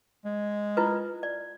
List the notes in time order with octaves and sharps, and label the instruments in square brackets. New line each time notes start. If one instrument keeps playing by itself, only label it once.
[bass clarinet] G#3
[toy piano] E4 F4 B4
D5